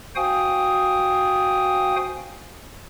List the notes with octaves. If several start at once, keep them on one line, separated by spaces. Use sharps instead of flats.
F#4 C5 F5 G5 G#5 D#6